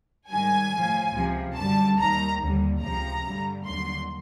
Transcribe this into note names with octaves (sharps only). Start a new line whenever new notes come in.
G#2 D#3 G3 G#5
A2 F3
C#2 C3 F3
F#2 D3 G3 A5
D#2 D#3 G3 A#5
D#2 D3 G3
C#2 C3 F3 A#5
G2 D3 G3
D#2 D3 F#3 C6